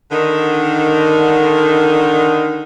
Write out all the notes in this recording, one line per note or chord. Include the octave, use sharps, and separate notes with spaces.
D3 D#3